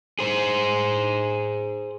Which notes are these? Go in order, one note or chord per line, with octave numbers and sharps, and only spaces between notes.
G#4 C5